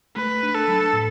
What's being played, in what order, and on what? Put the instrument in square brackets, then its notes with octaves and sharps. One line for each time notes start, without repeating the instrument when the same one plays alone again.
[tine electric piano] A3 [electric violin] B4
[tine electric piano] D4
[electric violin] A4
[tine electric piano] F#3
A2